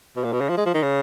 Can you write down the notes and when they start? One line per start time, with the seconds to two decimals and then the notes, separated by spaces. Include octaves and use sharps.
0.16 B2
0.24 A#2
0.33 B2
0.41 C#3
0.49 F3
0.57 G#3
0.66 F3
0.74 D#3
0.83 C#3